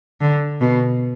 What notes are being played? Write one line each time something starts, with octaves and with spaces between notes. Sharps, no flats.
D3
B2